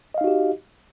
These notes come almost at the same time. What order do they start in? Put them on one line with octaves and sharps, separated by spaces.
D#5 F5 D#4 F#4 G4